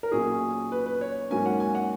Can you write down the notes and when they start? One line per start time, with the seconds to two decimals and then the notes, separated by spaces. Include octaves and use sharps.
0.03 A#4
0.12 B1 A#2 F#3 C#4 G#4
0.72 B4
0.86 B4
1.01 C#5
1.30 G#2 F#3 A#3 C#4 G#5
1.46 F#5
1.60 G#5
1.75 F#5